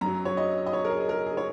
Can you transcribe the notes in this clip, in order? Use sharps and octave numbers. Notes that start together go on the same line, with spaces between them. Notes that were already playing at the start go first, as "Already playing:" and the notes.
F#2 F#3 A#5
C#5
D#5
D#5
C#5
A#4
G#4
A#4
G#4
C#5